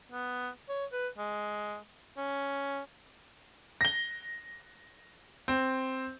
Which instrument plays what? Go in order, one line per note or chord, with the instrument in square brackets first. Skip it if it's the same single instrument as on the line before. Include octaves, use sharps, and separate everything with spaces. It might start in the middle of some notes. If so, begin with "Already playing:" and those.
[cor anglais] B3
C#5
B4
G#3
C#4
[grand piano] A#6 G7
C4